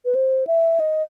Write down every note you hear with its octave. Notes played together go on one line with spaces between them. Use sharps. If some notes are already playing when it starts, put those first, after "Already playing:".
B4
C5
E5
D#5